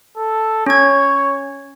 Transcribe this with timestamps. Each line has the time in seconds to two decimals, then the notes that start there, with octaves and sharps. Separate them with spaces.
0.17 A4
0.66 C#4 C#5 G#6